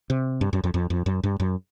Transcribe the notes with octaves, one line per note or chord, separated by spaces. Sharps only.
C3
G2
F#2
F2
F2
F2
F#2
G2
F#2